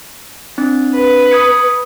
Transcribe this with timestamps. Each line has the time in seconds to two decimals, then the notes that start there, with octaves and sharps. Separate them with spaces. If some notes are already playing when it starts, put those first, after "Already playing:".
0.58 C4 D4
0.94 B4
1.31 D#6 G#6 C#7